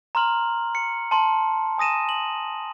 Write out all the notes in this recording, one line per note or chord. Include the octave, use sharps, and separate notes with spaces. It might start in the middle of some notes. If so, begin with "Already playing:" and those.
A#5 C6 F6 F#7
C#7
A5 C6
G#5 D#6 A#6 D#7 E7
F#7